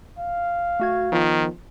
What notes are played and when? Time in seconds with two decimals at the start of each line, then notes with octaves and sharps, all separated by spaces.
0.18 F5
0.80 A3 F#4 G#6
1.12 D#3 F3 B3 F4